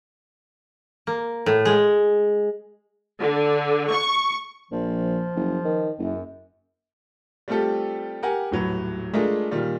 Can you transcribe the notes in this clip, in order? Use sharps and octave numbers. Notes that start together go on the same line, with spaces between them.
A#3
A2
G#3
D3
C#6
A#1 F3
F#1
D#3
F#1 F#2
G3 A3 C4 F4 G4 A4
G4 A#4 F#5 G#5
D#1 A2 F#3 B4
G#3 A3 D4 F4 G#4 A#4
A#2 D#3 G3 F4